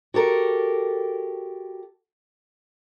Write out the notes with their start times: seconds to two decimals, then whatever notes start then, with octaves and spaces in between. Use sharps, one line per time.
0.14 F#4 G4 A4 A#4